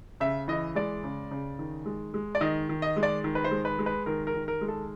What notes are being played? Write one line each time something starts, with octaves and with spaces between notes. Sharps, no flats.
C#3 E5
E3 D#5
G#3 D5
C#3
C#3
D#3
G#3
G#3
D5
D#3 D#5
D#3
D#5
G#3
D5
D#3
B4
C5
G#3
B4
G#3
B4
D#3 A#4
A#4
D#3
A#4
G#3
A4